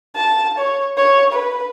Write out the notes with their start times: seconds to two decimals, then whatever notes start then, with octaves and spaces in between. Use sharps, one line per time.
0.16 A5
0.58 C#5
0.97 C#5
1.33 B4